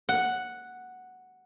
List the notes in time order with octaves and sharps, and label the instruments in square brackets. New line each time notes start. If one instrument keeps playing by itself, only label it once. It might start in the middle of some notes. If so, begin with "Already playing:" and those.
[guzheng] F#5